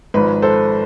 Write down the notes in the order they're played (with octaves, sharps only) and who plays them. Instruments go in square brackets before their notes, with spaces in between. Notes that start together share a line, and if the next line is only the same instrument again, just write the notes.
[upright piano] G#1 G#2 F3 B4
A4 C5